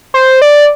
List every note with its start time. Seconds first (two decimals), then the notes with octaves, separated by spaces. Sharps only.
0.14 C5
0.42 D5